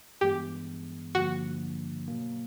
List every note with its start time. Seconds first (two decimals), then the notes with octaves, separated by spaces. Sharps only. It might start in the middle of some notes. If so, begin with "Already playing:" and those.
0.21 G2 E3 G#3 B3 G4
1.15 G2 D3 F3 A#3 F#4
2.08 B2 F#3 A#3